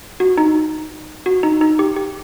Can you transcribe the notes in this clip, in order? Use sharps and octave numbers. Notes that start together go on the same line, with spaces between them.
F#4
D#4
F#4
D#4
D#4
G4
G4